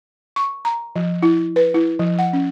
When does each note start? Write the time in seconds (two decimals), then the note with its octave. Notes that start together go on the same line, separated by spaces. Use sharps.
0.36 C#6
0.65 A#5
0.96 F3
1.23 E4
1.56 B4
1.74 E4
1.99 F3
2.19 F#5
2.33 C#4